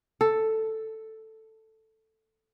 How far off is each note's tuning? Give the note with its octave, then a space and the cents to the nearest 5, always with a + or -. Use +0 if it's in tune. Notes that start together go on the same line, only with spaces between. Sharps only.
A4 +5